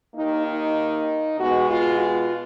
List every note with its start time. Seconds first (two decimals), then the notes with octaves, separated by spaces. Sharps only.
0.15 D#2 D#3 A#3 D#4
0.45 D#4
1.38 B2 G#3 B3 F#4
1.68 F4
1.99 F4